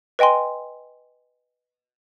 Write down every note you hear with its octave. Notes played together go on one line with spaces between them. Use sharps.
B4 D#5 G5 G#5 C6